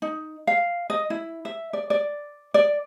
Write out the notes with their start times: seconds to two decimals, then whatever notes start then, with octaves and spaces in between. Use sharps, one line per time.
0.02 D#4
0.47 F5
0.90 D#5
1.10 E4
1.45 E5
1.73 D5
1.90 D5
2.54 D5